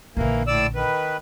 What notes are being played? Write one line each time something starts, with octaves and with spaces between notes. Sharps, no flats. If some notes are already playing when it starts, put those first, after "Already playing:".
A#1 D3 E3 A#3
A2 D5 E6
D#3 B4